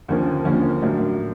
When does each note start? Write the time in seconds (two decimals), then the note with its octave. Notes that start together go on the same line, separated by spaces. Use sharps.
0.09 D#2 D3 F3 A#3 C#4
0.45 D#2 D3 F3 A#3 C#4
0.82 A2 F#3 A#3 D4